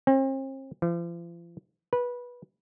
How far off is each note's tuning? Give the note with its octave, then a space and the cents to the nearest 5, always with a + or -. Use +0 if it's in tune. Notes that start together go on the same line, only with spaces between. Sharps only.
C4 +40
F3 -45
B4 -20